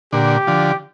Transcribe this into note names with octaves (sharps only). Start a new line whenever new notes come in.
A#2 D3 G4
D3 F3